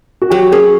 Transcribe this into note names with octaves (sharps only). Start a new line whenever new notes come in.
F#4
F#3 G4
C#4 G#4